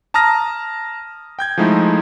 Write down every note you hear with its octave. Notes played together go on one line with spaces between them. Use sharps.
A5 A#5 D#6 F6 A#6
G5 G6 G#6
F3 G#3 A3 D#4 E4